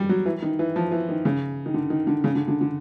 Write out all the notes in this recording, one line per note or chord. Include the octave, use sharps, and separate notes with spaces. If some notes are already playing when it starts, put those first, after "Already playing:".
Already playing: G3
F#3
E3
D#3
E3
F3
E3
D#3
C#3
D#3
D3
D#3
D3
C#3
D3
D3
D3